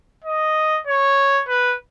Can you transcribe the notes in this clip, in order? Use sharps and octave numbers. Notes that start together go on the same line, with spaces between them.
D#5
C#5
B4